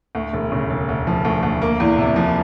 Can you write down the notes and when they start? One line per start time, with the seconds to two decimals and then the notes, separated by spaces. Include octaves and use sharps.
0.15 D2
0.33 E1
0.52 C#3
0.70 E1
0.89 D2
1.07 F3
1.25 D2
1.43 D2
1.62 A#3
1.80 E2
1.99 C3
2.16 F3